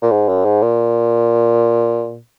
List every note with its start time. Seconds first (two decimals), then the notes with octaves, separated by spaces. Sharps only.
0.02 A#2
0.11 G#2
0.29 F#2
0.45 G#2
0.62 A#2